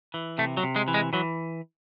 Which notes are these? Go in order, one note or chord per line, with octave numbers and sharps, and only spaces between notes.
E3
C3 A3
F#3
C3
G#3
E3
G#3
E3 F#3